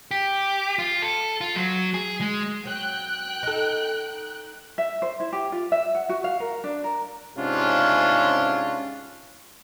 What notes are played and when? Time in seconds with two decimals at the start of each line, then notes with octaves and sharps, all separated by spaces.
0.11 G4
0.79 F4
1.02 A4
1.41 F4
1.56 F#3
1.94 G#4
2.21 G#3
2.65 F#3 G5 F#6
3.43 D#4 A4
4.78 E5
5.02 C5
5.20 E4
5.33 G4
5.52 F4
5.72 E5
5.95 F#5
6.09 F#4
6.24 F5
6.40 A#4
6.64 D4
6.84 A#4
7.37 G#2 C3 C#4 D4 F4